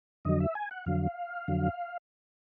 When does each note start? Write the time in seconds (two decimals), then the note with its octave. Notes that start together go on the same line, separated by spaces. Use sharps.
0.25 F2 D3 F#3 D#5
0.40 E5
0.55 G#5
0.71 F#5
0.86 F2 D3 F#3 F5
1.48 F2 D3 F#3